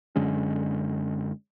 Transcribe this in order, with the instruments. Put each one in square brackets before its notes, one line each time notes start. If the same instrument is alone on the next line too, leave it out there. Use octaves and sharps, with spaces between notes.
[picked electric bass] F#2 D3 G#3 C#4